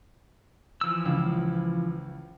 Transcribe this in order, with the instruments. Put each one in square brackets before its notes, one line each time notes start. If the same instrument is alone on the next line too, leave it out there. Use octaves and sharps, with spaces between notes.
[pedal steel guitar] E3 F3 E6
[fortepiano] C#2